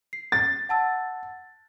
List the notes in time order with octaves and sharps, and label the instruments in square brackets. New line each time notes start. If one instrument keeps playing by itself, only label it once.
[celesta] C7
[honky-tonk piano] A6
[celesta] F#5 A5 E6